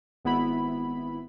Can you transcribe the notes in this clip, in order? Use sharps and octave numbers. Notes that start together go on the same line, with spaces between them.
G#1 B3 E4 B5